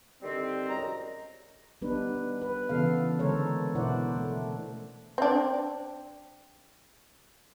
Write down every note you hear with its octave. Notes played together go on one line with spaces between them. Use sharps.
D3 D#3 G3 C4
C2 F#2 G#3 A#5
G3 B3 D4 D#4 B4
B4
C#3 E3 B3 A4 F5
D3 G#3 A4 A#4 C5 C#5
B2 E4 C5 D5 F#5
A3
C4 D4